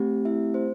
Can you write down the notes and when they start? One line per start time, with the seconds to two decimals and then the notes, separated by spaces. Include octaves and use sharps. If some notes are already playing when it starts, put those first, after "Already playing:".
Already playing: A3 C4 G4
0.25 E4 E5
0.54 C5